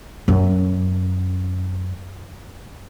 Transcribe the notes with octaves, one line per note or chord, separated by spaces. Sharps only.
F#2 C#4